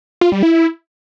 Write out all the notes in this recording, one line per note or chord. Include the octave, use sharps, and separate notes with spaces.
F4
G3
E4